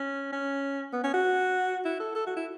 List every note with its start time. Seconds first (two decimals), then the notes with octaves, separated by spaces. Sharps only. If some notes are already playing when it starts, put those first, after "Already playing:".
Already playing: C#4
0.32 C#4
0.93 B3
1.04 C#4
1.14 F#4
1.85 E4
2.00 A4
2.15 A4
2.27 F#4
2.36 E4